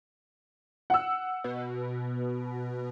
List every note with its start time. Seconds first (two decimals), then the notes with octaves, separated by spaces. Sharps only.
0.90 F#5 E6
1.44 B2